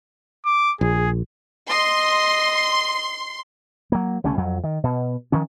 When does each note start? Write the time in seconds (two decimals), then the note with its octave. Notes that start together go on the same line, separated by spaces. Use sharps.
0.46 D6
0.81 A#1 G#4
1.69 D#5 C6
3.92 F#3 A#3
4.24 C2 D3 A3 C#4
4.37 F2 F#3
4.64 D#3
4.84 B2
5.32 D#3 F3 C#4